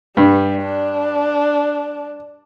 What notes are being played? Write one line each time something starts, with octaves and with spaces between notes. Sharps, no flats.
G2 G3
D4